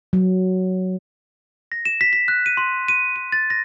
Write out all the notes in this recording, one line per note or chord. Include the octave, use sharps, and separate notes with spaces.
F#3
A#6
E7
B6
B6
F#6
D#7
C6
D#7
D#7
A6
A#6